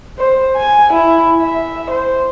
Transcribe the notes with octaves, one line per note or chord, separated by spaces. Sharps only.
C5
G#5
E4
E5
C5